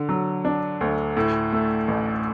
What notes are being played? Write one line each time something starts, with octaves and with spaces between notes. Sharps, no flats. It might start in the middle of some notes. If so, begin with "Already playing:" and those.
Already playing: D3
F#3
D4
D2
A2
A3
A1